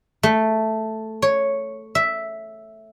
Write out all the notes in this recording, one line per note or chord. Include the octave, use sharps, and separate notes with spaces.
A3
C#5
E5